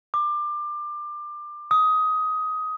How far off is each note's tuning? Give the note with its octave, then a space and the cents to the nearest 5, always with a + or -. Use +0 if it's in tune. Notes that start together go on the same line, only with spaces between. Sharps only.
D6 +25
D#6 +15